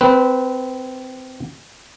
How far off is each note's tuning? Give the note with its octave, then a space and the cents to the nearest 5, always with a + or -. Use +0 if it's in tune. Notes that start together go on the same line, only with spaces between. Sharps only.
C4 -20 B4 +0